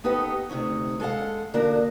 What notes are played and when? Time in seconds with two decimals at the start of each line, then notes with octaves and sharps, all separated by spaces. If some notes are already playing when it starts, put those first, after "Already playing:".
0.04 B3 D#4 G4 A4 B4 F#5
0.49 D2 C3 D#3 D#4 C#5
1.00 G#3 A4 D5 F5 F#5
1.54 D3 A#3 D4 D#4 F#4 A#4